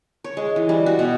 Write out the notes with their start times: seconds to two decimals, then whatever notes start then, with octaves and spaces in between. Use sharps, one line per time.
0.24 C#5
0.37 G#3
0.56 E3
0.69 G3
0.86 F#4
0.99 B2